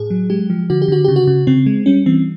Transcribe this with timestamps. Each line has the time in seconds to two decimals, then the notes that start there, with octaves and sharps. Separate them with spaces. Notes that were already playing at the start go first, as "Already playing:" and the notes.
Already playing: A2 G#4
0.10 F#3
0.30 G#3 G4
0.50 F3
0.70 D3 F#4
0.82 G4
0.88 D3 F#4
1.04 C#3 G4
1.16 F#4
1.27 C#3
1.47 C#3 C4
1.66 G#3
1.86 G3 C#4
2.06 E3 C4